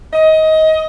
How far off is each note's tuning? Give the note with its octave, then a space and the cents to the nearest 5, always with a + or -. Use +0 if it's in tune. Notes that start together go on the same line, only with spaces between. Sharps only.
D#5 +20